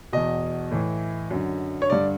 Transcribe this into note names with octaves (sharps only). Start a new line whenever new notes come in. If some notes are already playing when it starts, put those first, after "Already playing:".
E2 B2 D#5
A2 E3
F#2 D3
C#5
G2 D3 D5